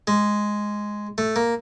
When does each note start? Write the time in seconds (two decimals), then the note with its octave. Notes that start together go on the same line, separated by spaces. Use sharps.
0.07 G#3
1.18 A3
1.36 A#3